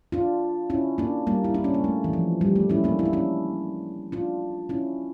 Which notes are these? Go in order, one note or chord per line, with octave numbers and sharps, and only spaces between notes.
D4 F4
C#4 E4
A#3 D4
G3 A#3
E4
D4
C#4
A#3
A3
E3
F3
G3
A3
C#4 E4
A#3 D4
E4
D4
C#4 E4
D4 F4
C#4 E4